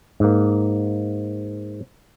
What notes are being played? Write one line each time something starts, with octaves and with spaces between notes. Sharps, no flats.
G#2 A#3